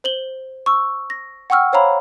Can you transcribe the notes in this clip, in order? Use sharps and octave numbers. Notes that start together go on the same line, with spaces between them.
C5 F#7 G7
C#6 E6
A#6
F#5 G5 C#6 E6 F6
C5 C#5 F5 A#5 B5